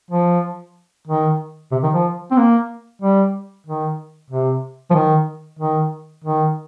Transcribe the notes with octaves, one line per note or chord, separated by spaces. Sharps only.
F3
D#3
C3
D#3
F3
C4
A#3
G3
D#3
C3
F3
D#3
D#3
D#3